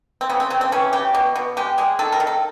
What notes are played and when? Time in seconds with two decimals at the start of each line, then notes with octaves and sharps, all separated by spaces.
0.21 C4
0.29 C#3 B3
0.40 C4
0.50 C#3 C4
0.61 C4
0.72 E3 C#4
0.93 C#3 G4
1.15 B2
1.35 B2
1.57 G#3 G4
1.78 G#3 G#4
1.99 D#3 A4
2.12 A#4
2.20 D#3
2.27 A4